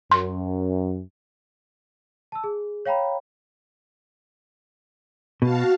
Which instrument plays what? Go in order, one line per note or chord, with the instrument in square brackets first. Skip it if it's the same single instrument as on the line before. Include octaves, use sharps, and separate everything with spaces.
[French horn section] F#2 [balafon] C6
[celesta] A5 E6
G#4
C#5 F5 G5 A#5 B5
[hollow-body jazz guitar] B2 [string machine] F#4 F5 A5